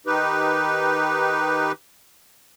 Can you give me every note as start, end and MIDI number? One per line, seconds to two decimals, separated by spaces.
0.07 1.72 51
0.07 1.72 63
0.07 1.72 67
0.07 1.72 71